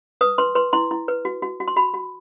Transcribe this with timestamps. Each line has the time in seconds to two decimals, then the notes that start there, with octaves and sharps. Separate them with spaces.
0.21 B4 D#6
0.38 B4 C6
0.55 B4 C6
0.73 E4 C6
0.91 E4
1.08 B4
1.25 F#4
1.42 F#4
1.60 F#4
1.68 C6
1.76 F#4 B5
1.94 F#4